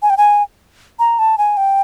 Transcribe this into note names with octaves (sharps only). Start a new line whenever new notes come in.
G#5
G5
G#5
A#5
A5
G#5
G5